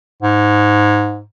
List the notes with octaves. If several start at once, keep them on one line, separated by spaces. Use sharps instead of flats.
G#2